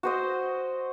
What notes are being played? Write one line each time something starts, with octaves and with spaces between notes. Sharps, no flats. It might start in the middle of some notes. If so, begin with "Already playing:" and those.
F#4 C5 D#5